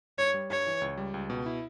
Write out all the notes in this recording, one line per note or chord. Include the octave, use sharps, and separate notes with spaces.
G2 C#5
G3
G2 C#5
E3
C#2
G3
C#2
B2
E4